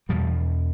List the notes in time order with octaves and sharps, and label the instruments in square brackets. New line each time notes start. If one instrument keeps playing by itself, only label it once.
[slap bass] E2 B2 F3 G3